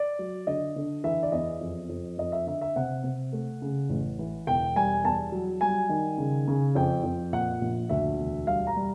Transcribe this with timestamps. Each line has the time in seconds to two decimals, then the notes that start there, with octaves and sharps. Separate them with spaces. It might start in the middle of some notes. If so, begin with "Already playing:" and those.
Already playing: D5
0.19 F#3
0.47 D3 D#5
0.76 D3
1.04 E3 E5
1.23 D5
1.32 E2 D#5
1.61 F2
1.89 F2
2.18 F2 D#5
2.32 E5
2.47 D3 E5
2.61 E5
2.76 C3 F#5
3.04 C3
3.33 A3
3.62 C#3
3.89 A1
4.19 E3
4.47 E1 G5
4.76 G3 G#5
5.04 E2 A5
5.32 F#3
5.61 G3 G#5
5.89 D#3
6.18 C#3
6.47 C#3
6.75 F2 G5
7.04 F2
7.33 A#2 F#5
7.61 A#1
7.89 D2 E5
8.18 E1
8.47 G3 F5
8.67 A#5
8.76 G3